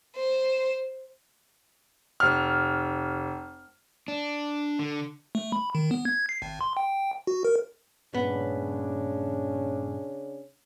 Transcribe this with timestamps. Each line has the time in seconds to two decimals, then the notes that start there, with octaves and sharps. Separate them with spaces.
0.16 C5
2.20 F1 F6
4.08 D4
4.79 D3
5.35 A3
5.52 B5
5.75 D#3
5.91 B3
6.05 G#6
6.29 C7
6.42 G#1
6.61 C6
6.77 G5
7.27 F#4
7.45 A#4
8.14 G2 A#2 C#3 B3 C#4 D4